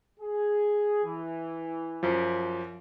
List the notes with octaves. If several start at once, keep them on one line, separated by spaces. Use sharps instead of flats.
G#4
E3
F#2 F3